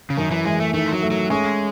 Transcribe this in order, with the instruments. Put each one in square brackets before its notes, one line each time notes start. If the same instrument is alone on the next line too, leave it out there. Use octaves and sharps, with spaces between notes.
[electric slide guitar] C#3
[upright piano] F#2 [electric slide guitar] D#3
[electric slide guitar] E3
[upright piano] E3 [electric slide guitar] G#3
[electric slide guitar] A3
[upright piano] D#3 [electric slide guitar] A3
[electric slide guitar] F#3
[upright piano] A3
[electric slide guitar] F#3
[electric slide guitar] G#3 [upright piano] C#4